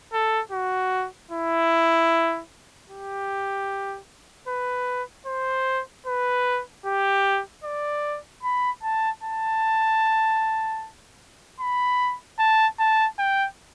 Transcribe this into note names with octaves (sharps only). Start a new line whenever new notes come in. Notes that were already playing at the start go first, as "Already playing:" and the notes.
A4
F#4
E4
G4
B4
C5
B4
G4
D5
B5
A5
A5
B5
A5
A5
G5